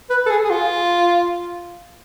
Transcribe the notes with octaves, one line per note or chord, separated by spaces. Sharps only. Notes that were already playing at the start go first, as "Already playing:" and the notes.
B4
A4
G#4
G#4
F4